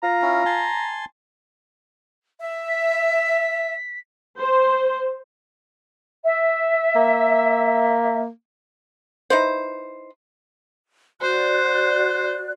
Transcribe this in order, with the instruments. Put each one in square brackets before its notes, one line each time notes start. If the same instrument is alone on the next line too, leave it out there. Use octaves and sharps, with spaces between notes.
[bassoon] F4 [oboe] A#5
[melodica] C#4 E4
G#5 A5 C6
[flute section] E5
[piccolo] B6
[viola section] C5
[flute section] E5
[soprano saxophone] A#3
[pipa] D#4 E4 B4 C5
[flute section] F#4 D5 F#6 [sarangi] C5